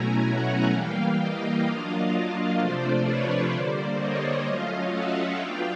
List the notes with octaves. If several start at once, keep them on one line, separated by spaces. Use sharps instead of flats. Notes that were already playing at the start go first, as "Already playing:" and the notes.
Already playing: B2 F#3 A3 C#4 E4 G#5 A#5
F#5 G#5
E3 G3 A#3 F5 G5
D#5 F5
F#3 A#3 D4 F4
C3 F3 A3 D4 F4 C5 D5
B4 C#5
D3 G3 A#3 C5 D5
C#5 D#5
F#3 A3 C#4 F4 D#5 F5
E5 F#5
F#3 B3 D4 F4 F5 G5